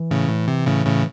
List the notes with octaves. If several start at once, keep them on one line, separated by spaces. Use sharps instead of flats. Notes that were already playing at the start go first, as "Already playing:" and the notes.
Already playing: E3
A2 C#3
A2
C3
A2 C#3
A2 C#3